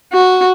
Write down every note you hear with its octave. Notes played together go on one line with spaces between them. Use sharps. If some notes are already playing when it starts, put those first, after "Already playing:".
F#4